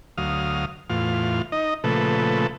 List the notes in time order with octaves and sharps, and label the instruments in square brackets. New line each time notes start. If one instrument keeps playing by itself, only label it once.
[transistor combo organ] D2 F#3 F5 D#6 F6
E2 A2 F4 F6
D#4 D#5
A#2 C#3 F3 A3 A4 B4